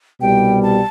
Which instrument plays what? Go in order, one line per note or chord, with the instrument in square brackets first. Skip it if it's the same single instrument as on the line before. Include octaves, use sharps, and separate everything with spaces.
[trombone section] C2 B2 G3 [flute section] G5
[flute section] A5